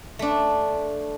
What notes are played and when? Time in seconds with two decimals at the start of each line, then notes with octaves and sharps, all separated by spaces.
0.19 A3 D4